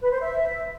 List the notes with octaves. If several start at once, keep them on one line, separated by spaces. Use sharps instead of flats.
B4
C5
E5